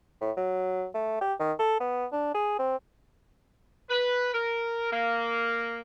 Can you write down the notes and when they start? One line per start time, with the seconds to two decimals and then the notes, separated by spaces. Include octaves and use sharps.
0.21 A2
0.37 F#3
0.94 A3
1.21 G4
1.39 D#3
1.59 A4
1.80 B3
2.12 D4
2.34 G#4
2.59 C4
3.89 B4
4.33 A#4
4.91 A#3